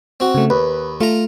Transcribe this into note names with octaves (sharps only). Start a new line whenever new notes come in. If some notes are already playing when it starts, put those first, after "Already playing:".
C4 F#4
C#3 A3
D#2 B4
A3 F4 A#5